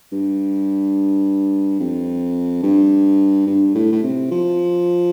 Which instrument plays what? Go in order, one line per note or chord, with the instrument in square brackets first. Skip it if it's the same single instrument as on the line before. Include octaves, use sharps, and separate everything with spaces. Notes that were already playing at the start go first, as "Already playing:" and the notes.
[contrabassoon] G2
F2
G2
G2
A2
A2
C3
F3